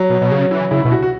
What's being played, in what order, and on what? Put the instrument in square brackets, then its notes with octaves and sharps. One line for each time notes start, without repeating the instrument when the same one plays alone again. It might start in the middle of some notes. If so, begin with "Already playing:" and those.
Already playing: [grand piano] F#3
[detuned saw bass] B2
B2
C#3
E3
[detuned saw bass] C#3 [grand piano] E4
[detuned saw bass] B2 [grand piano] E4
[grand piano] F#4
F#4